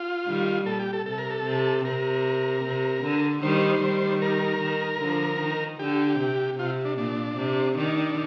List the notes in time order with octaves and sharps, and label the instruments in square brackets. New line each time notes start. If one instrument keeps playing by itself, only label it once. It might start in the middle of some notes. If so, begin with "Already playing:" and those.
Already playing: [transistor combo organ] F4
[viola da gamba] D#3 G3
[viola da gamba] A#2 [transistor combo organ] A4
[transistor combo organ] G4
A4
[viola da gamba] C3 [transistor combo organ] A4
[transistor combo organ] A#4
A4
[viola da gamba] C3
[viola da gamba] C3 [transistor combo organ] A#4
[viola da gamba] C3
D3
[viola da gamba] D#3 G3 [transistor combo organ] C5
[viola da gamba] D#3 G3
[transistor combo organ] A#4
[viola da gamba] D#3
D3 F3
D#3
[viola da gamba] D3 [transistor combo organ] G4
[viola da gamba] C3
[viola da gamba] C3 [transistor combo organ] F4
[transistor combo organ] D4
[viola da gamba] A#2 [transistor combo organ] D4
[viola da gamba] C3
[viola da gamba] D#3 [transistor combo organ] D4